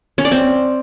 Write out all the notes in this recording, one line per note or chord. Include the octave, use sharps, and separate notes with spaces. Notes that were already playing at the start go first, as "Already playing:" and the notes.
C#4
D5
C4